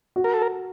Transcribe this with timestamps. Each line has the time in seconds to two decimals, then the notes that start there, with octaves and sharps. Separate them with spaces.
0.16 F#4
0.24 A#4
0.34 A4
0.42 A#4